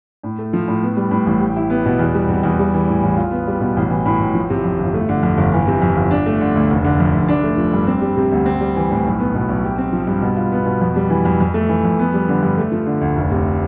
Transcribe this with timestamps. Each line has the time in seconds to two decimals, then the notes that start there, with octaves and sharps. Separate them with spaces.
0.23 A2
0.39 A3
0.53 F3
0.68 A2
0.83 B3
0.97 G3
1.11 A2
1.27 A1
1.40 G4
1.56 E4
1.70 B3
1.86 B2
1.99 E2
2.15 G3
2.29 C3
2.43 E2
2.59 G3
2.74 E3
2.88 A2
3.03 A1
3.17 F4
3.31 B3
3.47 G3
3.61 B2
3.77 A1
3.91 E3
4.06 A2
4.20 A1
4.35 F3
4.50 C3
4.64 F2
4.78 G1
4.94 A3
5.09 D3
5.23 F2
5.37 G1
5.53 E3
5.68 C3
5.82 F2
5.97 G1
6.11 D4
6.26 A3
6.41 D3
6.55 D2
6.70 F1
6.84 D3
6.99 F2
7.14 F1
7.28 D4
7.44 A3
7.58 F3
7.73 G2
7.87 C4
8.02 G3
8.17 C3
8.32 D2
8.46 C4
8.61 G3
8.76 E3
8.91 A2
9.05 B1
9.20 B3
9.35 B2
9.48 B1
9.64 G4
9.78 C4
9.93 F3
10.07 G2
10.22 B2
10.37 F4
10.52 B3
10.66 B2
10.81 F2
10.96 G3
11.10 E3
11.25 F2
11.40 F2
11.54 A3
11.69 E3
11.84 F2
11.99 B3
12.14 G3
12.28 D3
12.43 G2
12.58 A3
12.72 F3
12.86 D3
13.01 D2
13.16 F1
13.32 C3